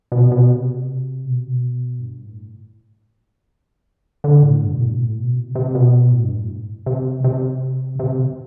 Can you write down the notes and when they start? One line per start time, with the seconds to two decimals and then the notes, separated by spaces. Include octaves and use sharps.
0.12 B2
0.26 C3
0.32 B2
0.49 C3
1.25 B2
1.37 C3
1.47 B2
1.99 G2
2.25 A2
4.24 D3
4.43 A2
4.63 G2
4.74 B2
4.81 A2
4.92 B2
4.99 A2
5.18 B2
5.36 C3
5.55 C3
5.75 B2
6.12 A2
6.24 G2
6.35 A2
6.86 C3
7.24 C3
7.99 C3